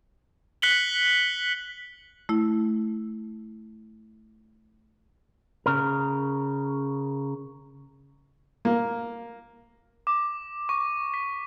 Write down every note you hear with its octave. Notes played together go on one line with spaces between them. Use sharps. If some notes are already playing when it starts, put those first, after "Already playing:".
F#6 B6 C#7 F#7 G7
A3 E4
C#3 A#4
A#3
D6
C#6
B6